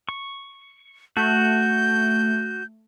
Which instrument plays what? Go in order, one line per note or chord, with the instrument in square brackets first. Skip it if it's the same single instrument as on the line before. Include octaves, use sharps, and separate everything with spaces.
[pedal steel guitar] C#6
[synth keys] A3 [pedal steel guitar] F#4 [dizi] G6